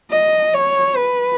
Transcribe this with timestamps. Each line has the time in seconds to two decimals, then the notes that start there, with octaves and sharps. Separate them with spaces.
0.11 D#5
0.54 C#5
0.96 B4